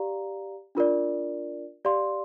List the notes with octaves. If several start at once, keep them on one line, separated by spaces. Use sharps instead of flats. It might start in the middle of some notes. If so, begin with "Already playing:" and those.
Already playing: G4 D5 F5 A#5
D4 F4 A#4 D5
G4 D5 F5 C6